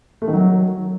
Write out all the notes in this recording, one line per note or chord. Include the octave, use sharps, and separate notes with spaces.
A3
D#3
F#3